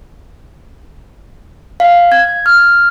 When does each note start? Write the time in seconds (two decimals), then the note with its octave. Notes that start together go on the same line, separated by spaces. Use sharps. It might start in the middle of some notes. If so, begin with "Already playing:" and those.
1.80 F5
2.12 G#6
2.46 F6